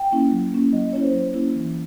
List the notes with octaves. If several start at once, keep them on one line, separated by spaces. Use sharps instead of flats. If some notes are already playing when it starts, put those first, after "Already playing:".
Already playing: G5
A#3 C#4 E4
F#3
A#3 C#4 E4
F#3 D#5
A#3 C#4 E4 C#5
C5
F#3
A#3 C#4 E4
E3